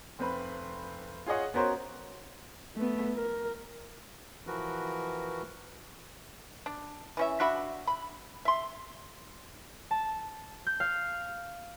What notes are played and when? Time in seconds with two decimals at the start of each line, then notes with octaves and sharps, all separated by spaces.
0.19 F1 C4 B4 B5
1.26 F4 G#4 C#5 D#5 F#5
1.54 B3 C#4 F#4 A#4 C5 C#5
2.76 A3 B3
3.15 A#4
4.47 E3 F3 F#4 A#4 B4
6.66 D4
7.17 E3 C#4 E5
7.40 D4 F#4 E5 B5
7.87 B5
8.45 E5 C6
9.91 A5
10.67 G6
10.80 F5